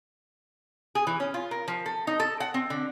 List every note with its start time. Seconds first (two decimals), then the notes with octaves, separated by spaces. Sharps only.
0.95 G#4
1.07 E3
1.20 C#4
1.34 F4
1.51 A#4
1.68 F3
1.86 A4
2.07 D#4
2.20 A4
2.40 F#5
2.54 C4
2.70 D3